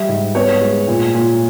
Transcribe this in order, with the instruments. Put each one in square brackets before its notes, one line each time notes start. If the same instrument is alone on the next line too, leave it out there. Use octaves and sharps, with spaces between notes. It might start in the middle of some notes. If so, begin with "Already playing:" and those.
Already playing: [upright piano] G3 E5
G#2
B3 C#5
G#3
A#2
A#2